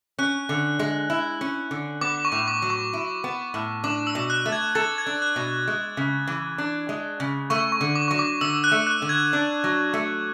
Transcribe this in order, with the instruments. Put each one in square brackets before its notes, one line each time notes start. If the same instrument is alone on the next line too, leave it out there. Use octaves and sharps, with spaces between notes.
[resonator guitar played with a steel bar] C#4 [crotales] F#6
[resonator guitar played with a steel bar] D3
G#3
E4
C#4
D3
[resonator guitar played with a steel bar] B3 [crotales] D6
[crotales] C#6
[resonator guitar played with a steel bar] A2
[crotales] D6
[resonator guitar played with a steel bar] F#3
[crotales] C#6
[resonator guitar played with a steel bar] E4
B3
A2
[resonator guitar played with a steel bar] D4 [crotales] D6
[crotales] E6
[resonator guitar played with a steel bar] B2
[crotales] F#6
[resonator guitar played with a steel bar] A3
[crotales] G#6
[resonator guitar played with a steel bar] A4 [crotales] A6
[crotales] G#6
[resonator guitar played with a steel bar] D4
[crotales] F#6
[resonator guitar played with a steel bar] B2
G#3
C#3
E3
D4
G#3
C#3
[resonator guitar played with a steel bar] A3 [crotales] C#6
[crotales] C#6
[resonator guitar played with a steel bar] D3
[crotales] D6
[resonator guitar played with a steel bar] F#3 [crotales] C#6
[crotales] D6
[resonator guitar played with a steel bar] D3 [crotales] E6
[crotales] F#6
[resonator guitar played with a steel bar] A3
[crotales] F#6
[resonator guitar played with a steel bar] D3
[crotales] G#6
[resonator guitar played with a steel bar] D4
F#3
A3